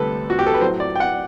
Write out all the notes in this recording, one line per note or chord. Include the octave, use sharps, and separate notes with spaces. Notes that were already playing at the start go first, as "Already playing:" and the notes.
Already playing: D2 C3 G3 A4 B4
F#4
G4
A4
B4
A2 F#3 C5
D5
G5
F#5